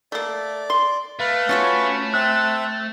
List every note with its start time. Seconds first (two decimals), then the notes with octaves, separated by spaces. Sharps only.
0.12 A3 A#3 D5
0.70 C6
1.20 A3 B4 F5
1.49 C#4 F4 F#4 C#5
2.14 C4 E5 E6 F#6